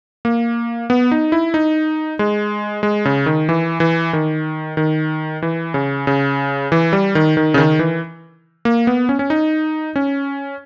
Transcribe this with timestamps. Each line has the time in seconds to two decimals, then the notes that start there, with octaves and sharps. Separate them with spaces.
0.25 A#3
0.90 B3
1.11 D#4
1.32 E4
1.54 D#4
2.19 G#3
2.83 G#3
3.05 C#3
3.26 D#3
3.49 E3
3.80 E3
4.13 D#3
4.77 D#3
5.42 E3
5.74 C#3
6.07 C#3
6.72 E3
6.93 G3
7.15 D#3
7.37 D#3
7.54 C#3
7.58 D#3
7.79 E3
8.65 A#3
8.87 B3
9.09 C#4
9.19 C#4
9.30 D#4
9.96 C#4